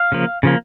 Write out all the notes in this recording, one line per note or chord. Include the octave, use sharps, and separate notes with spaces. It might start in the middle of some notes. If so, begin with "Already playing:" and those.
Already playing: F5
C#3 F3 A#3
C#3 F3 A#3